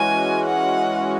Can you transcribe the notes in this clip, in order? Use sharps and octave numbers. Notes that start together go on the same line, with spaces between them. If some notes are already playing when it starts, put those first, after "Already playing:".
Already playing: E3 G#3 C#4 F#4 G#5
F#5